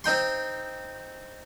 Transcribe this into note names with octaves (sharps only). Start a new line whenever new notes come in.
C4 D#4 G5 C6